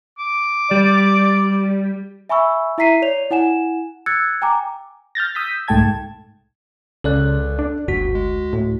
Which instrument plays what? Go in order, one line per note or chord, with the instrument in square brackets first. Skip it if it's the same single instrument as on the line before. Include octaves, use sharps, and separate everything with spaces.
[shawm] D6
[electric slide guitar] G3 [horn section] D5
[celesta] E5 G#5 B5 C#6 E6
E4 E5 A#5 B6 C7 D#7
C#5 D5 F7
E4 F#5 G#5 E7
E6 F#6 G#6 A6 C#7
G5 G#5 A#5 D6
[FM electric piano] F6 G6 A6 A#6
D#6 E6 G6 A#6 B6
C2 G#2 A3 G5 A5 G#6
[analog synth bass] C#2 [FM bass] C#3 [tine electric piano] A4 D5 F#6
[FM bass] D4
[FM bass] G1 [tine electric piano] D2 F#4 B6 [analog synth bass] G2
[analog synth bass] G#3
[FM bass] A2